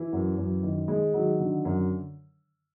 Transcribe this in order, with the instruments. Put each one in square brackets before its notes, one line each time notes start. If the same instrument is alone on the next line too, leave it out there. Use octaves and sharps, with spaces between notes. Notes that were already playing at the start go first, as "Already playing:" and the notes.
Already playing: [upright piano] E3 E4
F#2
F#2
D#3
G#3
D#3 F#3 D#4
D3
F#2